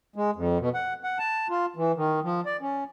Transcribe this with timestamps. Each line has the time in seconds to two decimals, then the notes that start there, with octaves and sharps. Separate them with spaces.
0.16 G#3
0.36 F2
0.60 B2
0.74 F#5
1.04 F#5
1.19 A5
1.50 F4
1.76 E3
1.96 D#3
2.24 F3
2.46 D5
2.61 C#4